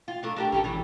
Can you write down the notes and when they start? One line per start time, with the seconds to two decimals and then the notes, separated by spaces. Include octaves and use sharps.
0.08 F4
0.23 A3 D4 D#4
0.36 D4 G4 A#4
0.52 G#1 C#4 G4 A4
0.64 E3 F#3 G3